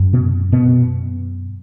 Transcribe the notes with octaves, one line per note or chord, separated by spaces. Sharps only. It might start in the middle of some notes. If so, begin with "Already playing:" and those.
Already playing: F#2
B2 B3
B2 B3